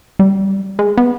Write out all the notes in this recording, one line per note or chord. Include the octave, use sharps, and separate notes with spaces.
G3
G#3
B3